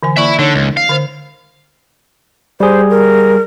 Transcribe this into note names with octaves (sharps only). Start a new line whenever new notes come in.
D3 E3 G#5
A#3 D5 E5 B5 C#6
D3 D#4 A4 C#5
C#2
F5
D3 C5
G3 G#4 C5
A#4